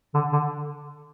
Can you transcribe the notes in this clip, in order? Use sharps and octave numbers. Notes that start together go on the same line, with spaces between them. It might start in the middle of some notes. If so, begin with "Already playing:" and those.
D3
D3